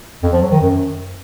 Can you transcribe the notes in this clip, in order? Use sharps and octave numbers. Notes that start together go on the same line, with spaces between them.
F2
F3
F#3
D#3
F#2